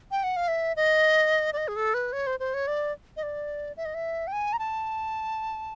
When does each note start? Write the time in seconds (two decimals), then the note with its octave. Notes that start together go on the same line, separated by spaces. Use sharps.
0.11 G5
0.24 F#5
0.36 F5
0.48 E5
0.76 D#5
1.53 D5
1.57 D#5
1.68 G#4
1.76 A4
1.94 B4
2.13 C#5
2.27 C5
2.40 C5
2.54 C#5
2.68 D5
3.17 D#5
3.23 D5
3.77 E5
3.85 D#5
3.94 E5
4.27 G5
4.32 G#5
4.53 A#5
4.59 A5